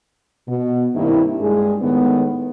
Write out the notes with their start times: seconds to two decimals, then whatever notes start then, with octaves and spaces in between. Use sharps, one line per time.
0.48 B2
0.95 G2 D#3 A#3 C4 E4
1.41 G2 G#3 G#4
1.82 A2 D#3 G#3 B3